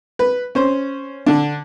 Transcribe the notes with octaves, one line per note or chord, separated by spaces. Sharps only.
B4
C#4 C5
D3 D4